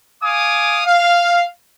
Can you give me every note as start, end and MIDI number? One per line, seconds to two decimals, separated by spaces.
0.23 0.82 77
0.23 0.82 80
0.23 0.82 86
0.23 0.82 87
0.87 1.44 77